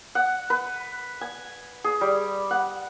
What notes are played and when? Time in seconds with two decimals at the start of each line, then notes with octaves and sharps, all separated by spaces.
0.15 F#5
0.50 B4
1.21 G#5
1.84 G#4
2.01 G3
2.51 F#5